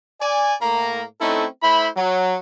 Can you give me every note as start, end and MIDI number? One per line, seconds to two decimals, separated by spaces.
0.21 0.55 74
0.21 0.55 80
0.61 1.03 45
0.61 1.03 58
0.61 1.03 82
1.21 1.46 57
1.21 1.46 60
1.21 1.46 61
1.21 1.46 63
1.21 1.46 64
1.21 1.46 69
1.63 1.88 57
1.63 1.88 64
1.63 1.88 72
1.63 1.88 76
1.63 1.88 83
1.97 2.37 54